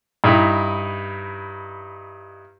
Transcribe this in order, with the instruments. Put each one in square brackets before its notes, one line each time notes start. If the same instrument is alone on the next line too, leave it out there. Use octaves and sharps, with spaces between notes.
[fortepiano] G2 D#4 E4